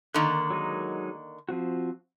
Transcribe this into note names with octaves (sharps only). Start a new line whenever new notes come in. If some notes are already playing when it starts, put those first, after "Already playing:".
D3 D#3 A#3 F#6
F#3 G#3 D#4
F3 C4 F#4